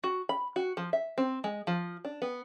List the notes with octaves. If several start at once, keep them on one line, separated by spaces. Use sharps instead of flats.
F#4
B5
F#4
F3
E5
C4
G#3
F3
D4
B3